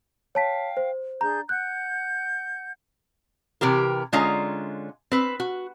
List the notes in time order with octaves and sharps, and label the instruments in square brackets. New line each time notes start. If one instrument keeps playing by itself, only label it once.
[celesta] C#5 A5 B6 [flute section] F5 G5
[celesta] C5
[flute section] D4 G#4 G6 [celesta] A#5
[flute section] F#5 G6 [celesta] F#6
[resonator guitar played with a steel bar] C3 E3 G4 A#4
D3 G#3 C#4 F4 D#5 A#5
C4 B4
F#4